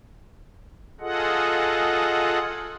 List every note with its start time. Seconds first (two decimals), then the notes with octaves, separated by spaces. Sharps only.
1.00 F4 G#4 A4 D#5 F#5